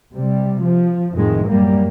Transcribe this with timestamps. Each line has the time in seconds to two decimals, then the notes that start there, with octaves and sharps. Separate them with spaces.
0.12 C3 G3
0.62 F3
1.14 F2 A2 D#3 G#3
1.46 F#2 G3 A#3